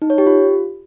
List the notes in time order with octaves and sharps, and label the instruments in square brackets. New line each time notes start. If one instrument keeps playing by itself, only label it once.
[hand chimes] D#4
C#5
G4
F4